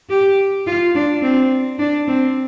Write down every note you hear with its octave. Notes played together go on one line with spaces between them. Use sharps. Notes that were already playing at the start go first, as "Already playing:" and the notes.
G4
F4
D4
C4
D4
C4